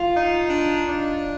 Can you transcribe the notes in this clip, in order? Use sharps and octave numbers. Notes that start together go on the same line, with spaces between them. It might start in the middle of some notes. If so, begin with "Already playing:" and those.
Already playing: F4
D#4
D4
D4